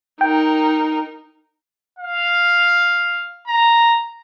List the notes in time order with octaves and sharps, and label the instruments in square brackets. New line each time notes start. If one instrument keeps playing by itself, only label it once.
[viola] D#4 A#4 [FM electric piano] G5
[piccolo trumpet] F5
A#5